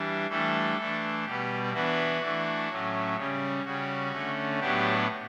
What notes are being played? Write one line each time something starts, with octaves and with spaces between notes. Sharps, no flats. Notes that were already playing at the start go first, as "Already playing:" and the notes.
Already playing: E3 G3 D4
E3 G3 A3 D4 A4
E3 A3 D4
B2 G3 B3 G4
E3 B3 D4 F#4
E3 A3 D4
A2 F#3 A3 C#4
C#3 G3 C#4
C#3 G3 C#4 F#4
D3 A3 C#4
A2 F#3 B3 D4 G4